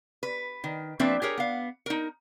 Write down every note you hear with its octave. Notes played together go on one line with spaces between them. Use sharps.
B4
D#3
F3 A#3 C4 D4 B4 E5
G4 G#4 A#4 C#5
B3 F5
D#4 A#4